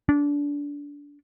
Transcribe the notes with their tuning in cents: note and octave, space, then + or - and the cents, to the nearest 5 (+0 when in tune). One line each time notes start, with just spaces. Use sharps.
D4 -25